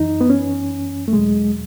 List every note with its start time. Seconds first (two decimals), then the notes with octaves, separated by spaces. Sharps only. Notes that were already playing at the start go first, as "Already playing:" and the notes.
Already playing: F#2 E3 D#4
0.21 B3
0.30 C#4
1.08 A3
1.13 E2 B2 F#3 G#3